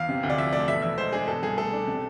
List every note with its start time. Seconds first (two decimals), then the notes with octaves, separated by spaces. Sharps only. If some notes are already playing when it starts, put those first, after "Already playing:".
Already playing: E2 F5
0.09 C3
0.23 D2
0.30 D5
0.38 F3 E5
0.53 A3 D5
0.68 B2 E5
0.82 E2 E5
0.98 G#3 C5
1.13 D4 G#4
1.28 B2 A4
1.43 C2 G#4
1.57 A3 A4
1.73 D4
1.87 C3